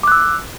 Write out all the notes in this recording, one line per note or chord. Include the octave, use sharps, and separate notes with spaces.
D6 E6 F#6